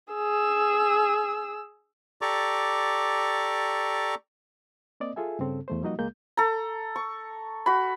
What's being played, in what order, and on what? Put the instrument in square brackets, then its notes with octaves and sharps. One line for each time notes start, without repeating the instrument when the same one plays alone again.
[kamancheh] G#4 E6
[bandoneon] G4 A4 D5 A#5 C#6 D6
[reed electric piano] A#3 C4 D5 D#5
F4 G#4 A4 E5 G#5
G2 C#3 C4 A4
E2 A3 C5
F3 G3 A#3 D#4 F#4 D#5
C#2 G#3 A#3 G6
[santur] A4 A#5
C#6
F#4 B5